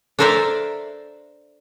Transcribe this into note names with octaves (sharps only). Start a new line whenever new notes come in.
D4 A4 A#4 C5 D5 E5